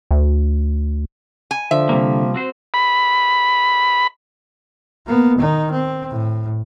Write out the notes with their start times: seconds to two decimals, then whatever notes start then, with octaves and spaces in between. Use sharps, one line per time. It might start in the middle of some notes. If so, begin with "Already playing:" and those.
0.11 D2
1.51 G#5
1.71 D3 F3 E5
1.89 C3 G3 A#3
2.34 C4 F#4 C5
2.74 B5
5.07 A#3 B3
5.38 D#3 D#4
5.71 C4
6.10 A2